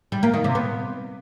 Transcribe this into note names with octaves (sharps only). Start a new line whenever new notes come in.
G3
A#3
D#3
C3
B3